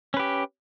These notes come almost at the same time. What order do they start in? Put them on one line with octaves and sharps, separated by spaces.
C#4 B4 G4